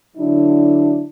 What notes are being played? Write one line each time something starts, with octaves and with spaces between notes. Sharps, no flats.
D3 F#3 D4 E4